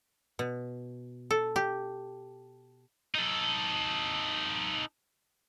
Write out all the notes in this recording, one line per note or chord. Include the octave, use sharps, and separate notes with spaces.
B2
A4
G4
D#4 A4